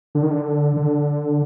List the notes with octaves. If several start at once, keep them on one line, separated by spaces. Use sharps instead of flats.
D3
D#3
D3
D3